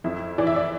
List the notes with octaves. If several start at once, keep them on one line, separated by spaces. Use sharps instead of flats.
F2 E4
E3 D5
E5
D5